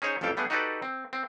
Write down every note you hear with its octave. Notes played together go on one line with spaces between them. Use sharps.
C#4 D#4 G#4 C5 C#5
A1 F2 G3 A4 F5 G5
G3 A3 B3 D4 G#4
D#4 F#4 G4 A4 B4 D5
C4
C4